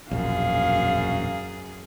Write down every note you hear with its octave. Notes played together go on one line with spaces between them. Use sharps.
E1 A#1 F#2 G#4 F5